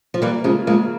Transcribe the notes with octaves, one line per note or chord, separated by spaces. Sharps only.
F3
E3 G3 A#3
C#3 F3 G#3
F3 G#3 A#3